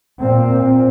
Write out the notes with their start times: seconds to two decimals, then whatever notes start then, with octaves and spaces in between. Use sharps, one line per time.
0.19 A#2 C4